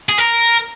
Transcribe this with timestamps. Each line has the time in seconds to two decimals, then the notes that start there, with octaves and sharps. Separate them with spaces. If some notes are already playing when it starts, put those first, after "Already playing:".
0.09 G#4
0.18 A#4